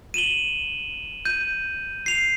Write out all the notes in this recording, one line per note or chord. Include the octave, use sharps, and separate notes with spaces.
D#7 E7 F#7 G7
G6 D#7
C7 F7